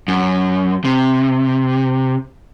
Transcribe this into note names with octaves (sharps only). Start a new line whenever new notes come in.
F#2
C3